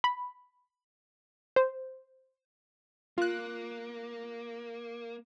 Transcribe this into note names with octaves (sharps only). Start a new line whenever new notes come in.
B5
C5
A#3 F4 F#6